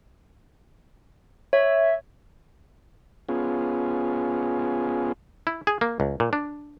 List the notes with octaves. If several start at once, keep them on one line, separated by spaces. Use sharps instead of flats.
C#5 E5
B3 C#4 F4 G#4
E4
G#4
A#3
C#2
A#2
D4